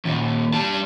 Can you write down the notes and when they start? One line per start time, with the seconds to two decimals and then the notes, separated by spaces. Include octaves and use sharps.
0.05 D#2 A#2
0.54 G3 A5